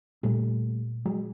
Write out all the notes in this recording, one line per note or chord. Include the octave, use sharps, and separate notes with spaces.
A#2 G3 A3
F#3 G#3